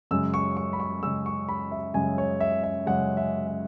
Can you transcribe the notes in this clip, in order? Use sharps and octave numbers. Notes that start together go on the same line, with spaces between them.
F#2 C#3 G#3 E6
C#6
C#6
B5
C#6
F#2 C#3 G#3 E6
C#6
B5
E5
F#2 C#3 G#3 G#5
C#5
E5
E5
F#2 C#3 G#3 F#5
E5
E5